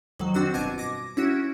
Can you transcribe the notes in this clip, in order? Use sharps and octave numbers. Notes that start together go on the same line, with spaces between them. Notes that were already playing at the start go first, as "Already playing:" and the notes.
F2 D#3 F#3
C4 D4 F#4 E6
G1 B2 D6 G#6 D#7
D6 A#6
C#4 E4 F#4